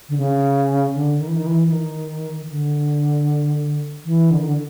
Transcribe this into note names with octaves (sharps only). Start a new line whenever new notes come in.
D3
C#3
D3
D#3
E3
D#3
E3
E3
D#3
D3
E3
D3
D#3
D3